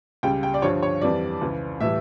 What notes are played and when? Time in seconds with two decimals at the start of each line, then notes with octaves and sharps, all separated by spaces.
0.23 C#2 C#3 G3 G5
0.43 G5
0.54 D5
0.62 G2 D3 F3 C#5
0.83 C#5
1.01 F2 E3 G3 D5
1.41 C#2 C#3 E3
1.80 A2 E3 G3 E5